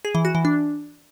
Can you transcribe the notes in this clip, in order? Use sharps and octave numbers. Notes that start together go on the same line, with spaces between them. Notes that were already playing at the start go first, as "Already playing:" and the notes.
G#4
E3
F#4
E3
D4